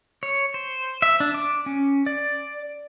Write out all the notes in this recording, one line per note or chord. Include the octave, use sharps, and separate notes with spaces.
C#5
C5
E5
D4
D6
C#4
D5